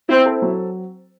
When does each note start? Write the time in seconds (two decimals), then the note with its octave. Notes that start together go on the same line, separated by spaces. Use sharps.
0.09 C4 E4
0.26 A4
0.42 F#3